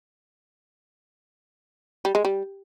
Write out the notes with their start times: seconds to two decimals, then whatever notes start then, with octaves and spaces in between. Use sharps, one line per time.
2.05 G3
2.15 G#3
2.25 G3